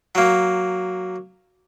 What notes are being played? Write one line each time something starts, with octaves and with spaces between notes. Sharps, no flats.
F#3 A#3